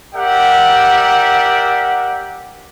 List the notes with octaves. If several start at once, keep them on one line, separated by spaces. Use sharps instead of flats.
G4 A#4 D5 E5 F#5